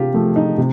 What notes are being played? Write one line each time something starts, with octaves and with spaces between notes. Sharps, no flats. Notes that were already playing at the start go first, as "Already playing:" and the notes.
Already playing: C3 F4 G4
F3 A3
D#4
C3